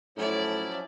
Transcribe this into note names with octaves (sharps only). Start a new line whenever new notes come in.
A2 F3 F#3 C#4 E4 D5